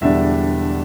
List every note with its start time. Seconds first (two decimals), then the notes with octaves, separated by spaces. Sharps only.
0.01 E1 E2 D3 G3 D4 E5